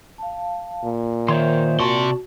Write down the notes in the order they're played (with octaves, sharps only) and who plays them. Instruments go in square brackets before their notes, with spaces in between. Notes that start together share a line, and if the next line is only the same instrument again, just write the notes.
[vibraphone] F5 A5
[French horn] A#2
[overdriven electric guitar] D#3 [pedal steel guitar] C5 C#5 C6 [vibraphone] E5
[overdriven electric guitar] C3 C6 [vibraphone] F#4 [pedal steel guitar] D5 A5 C#6